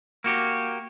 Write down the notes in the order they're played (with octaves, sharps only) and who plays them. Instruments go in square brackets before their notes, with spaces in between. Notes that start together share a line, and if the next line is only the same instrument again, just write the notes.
[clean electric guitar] A#3 F#4 G4